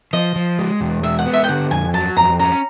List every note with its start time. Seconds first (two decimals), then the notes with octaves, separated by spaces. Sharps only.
0.13 F3 D#5
0.36 F3
0.59 G#3
0.81 E2
1.03 G#3 E5
1.19 F#5
1.26 B3
1.33 E5
1.44 G5
1.49 D3 F#5
1.71 F2 G#5
1.94 F#3 A5
2.17 F2 A#5
2.39 C#4 A#5